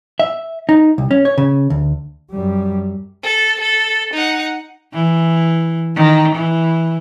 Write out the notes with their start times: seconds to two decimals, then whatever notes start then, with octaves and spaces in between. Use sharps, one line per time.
0.20 E5
0.69 D#4
0.98 C2
1.11 C#4
1.25 C#5
1.38 C#3
1.70 D2
2.31 F#2 G3
3.23 A4
3.61 A4
4.14 D#4 F#5
4.93 E3
5.95 D#3
6.35 E3